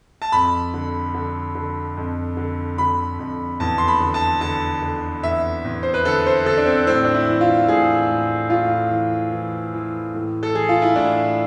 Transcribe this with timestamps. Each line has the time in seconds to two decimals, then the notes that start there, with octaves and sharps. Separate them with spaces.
0.22 A5
0.32 F2 B5
0.74 D3
1.14 D3
1.55 D3
1.97 F2
2.37 D3
2.78 D3 B5
3.19 F2
3.60 E2 A5
3.78 C6
3.88 B5
4.00 D3
4.14 A5
4.41 D3 A5
4.82 D3
5.23 E2 E5
5.65 E2
5.83 C5
5.94 B4
6.05 D3 A4
6.26 C5
6.45 D3 A4
6.57 D4
6.66 C4
6.86 A2 C4
7.05 D4
7.14 E4
7.28 E3
7.41 F4
7.69 A2 G#4
8.10 A2
8.50 A2 F4
8.91 E3
9.32 E3
9.74 E3
10.15 A2
10.43 A4
10.54 E3 G#4
10.69 F4
10.82 E4
10.95 A2 D4